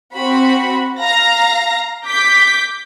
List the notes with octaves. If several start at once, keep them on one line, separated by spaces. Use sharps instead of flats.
C4 F#4 B5
F5 A#5 A#6
D6 G6 B6